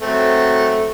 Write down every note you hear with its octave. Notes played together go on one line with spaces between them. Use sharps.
F#3 A3 C4